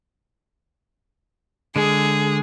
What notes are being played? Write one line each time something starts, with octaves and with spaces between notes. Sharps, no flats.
D3 G#3 G#4